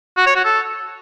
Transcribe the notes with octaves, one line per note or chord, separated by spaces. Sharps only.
F#4
C#5
F#4
A4